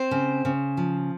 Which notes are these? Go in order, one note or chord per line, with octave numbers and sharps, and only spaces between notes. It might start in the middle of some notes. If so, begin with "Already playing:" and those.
Already playing: C4 C5
C#3
C#3
F3